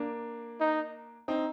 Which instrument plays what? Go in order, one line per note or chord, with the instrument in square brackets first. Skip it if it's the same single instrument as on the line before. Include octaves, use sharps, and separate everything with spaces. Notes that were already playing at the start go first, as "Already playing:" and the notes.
Already playing: [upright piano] A#3 D4
[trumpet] D#4
[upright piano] C4 D#4